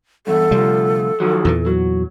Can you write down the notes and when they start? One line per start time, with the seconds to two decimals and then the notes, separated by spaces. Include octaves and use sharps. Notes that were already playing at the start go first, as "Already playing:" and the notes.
0.27 E2 G2 A4
0.51 D2 C3 F3 G3 F4
1.20 D#3 F3 F#3
1.45 E2 A#2 E3
1.66 F#3